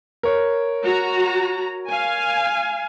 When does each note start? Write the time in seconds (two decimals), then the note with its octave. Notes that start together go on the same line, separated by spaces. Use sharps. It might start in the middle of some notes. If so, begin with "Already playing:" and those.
0.23 A#4 C#5
0.83 F#4 A#5
1.90 F5 G#5